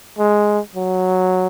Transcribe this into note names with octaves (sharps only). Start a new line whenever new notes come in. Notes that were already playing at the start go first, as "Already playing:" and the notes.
G#3
F#3